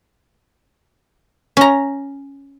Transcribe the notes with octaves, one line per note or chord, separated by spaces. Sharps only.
C#4 A#5